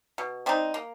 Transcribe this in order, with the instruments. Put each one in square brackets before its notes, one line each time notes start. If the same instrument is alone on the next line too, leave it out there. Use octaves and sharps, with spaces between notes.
[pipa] B2
G3 C4 D#4
A#3